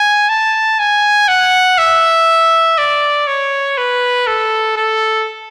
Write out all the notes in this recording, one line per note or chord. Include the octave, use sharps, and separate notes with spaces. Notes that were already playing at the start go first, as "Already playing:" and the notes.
Already playing: G#5
A5
G#5
F#5
E5
D5
C#5
B4
A4
A4